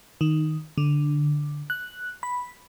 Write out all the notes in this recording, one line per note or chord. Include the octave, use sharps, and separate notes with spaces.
D#3
D3
F#6
B5